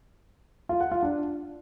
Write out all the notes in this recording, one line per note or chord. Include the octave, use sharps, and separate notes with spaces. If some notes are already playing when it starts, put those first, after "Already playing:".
F4
F#5
F4
D4